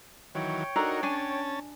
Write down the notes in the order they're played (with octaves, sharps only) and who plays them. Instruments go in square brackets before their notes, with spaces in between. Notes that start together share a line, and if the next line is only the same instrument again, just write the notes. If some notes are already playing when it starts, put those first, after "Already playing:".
[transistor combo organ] D#3 E3 F#3 [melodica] C#5 G5
[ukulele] D4 A4 A#5 [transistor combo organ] D#4 F#4 A#4
[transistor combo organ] C#4 A5 [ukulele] D4 G#5